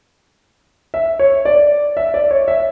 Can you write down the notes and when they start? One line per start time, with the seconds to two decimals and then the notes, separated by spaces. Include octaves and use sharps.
0.94 E5
1.19 C#5
1.45 D5
1.97 E5
2.14 D5
2.31 C#5
2.48 E5